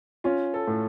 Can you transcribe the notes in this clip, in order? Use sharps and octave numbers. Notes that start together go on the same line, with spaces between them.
C#4 F4
A4
A2